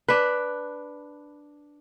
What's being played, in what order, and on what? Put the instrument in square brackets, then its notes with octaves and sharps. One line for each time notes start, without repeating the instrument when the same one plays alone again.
[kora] D4 B4